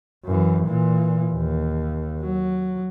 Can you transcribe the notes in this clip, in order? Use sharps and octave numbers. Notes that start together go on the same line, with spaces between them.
F#2 E3
A#2 E3
D#2
F#3